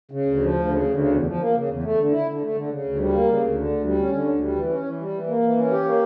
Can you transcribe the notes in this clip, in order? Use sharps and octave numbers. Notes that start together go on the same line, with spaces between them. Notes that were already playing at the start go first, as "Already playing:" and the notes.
C#3
D2
F3
D2
C#3
D2
C#3
E2
F3
A#3
C#3
E2
A3
D3
E4
D3
A3
D3
C#3
D2
G3
A#3
C#3
D2
D3
D2
G3
C#4
D3
D2
G3
E3
C#4
E3
G3
E3
A#3
E3
C#4
G4
A#3